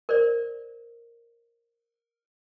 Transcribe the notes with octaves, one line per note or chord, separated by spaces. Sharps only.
A#4 C5 D5